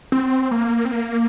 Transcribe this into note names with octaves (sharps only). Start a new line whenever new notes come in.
C4
A#3
C4
A#3